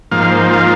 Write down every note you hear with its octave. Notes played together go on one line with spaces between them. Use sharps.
G#2 F3 A#3 F5
C5
F4